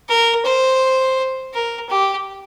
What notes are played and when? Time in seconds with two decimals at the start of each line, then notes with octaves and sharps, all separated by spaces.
0.09 A#4
0.46 C5
1.54 A#4
1.90 G4